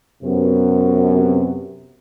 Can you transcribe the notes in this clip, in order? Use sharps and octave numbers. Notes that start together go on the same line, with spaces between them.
F#2 C3 B3